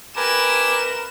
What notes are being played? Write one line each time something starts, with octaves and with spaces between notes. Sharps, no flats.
G4 A#4 B4 G#5 E7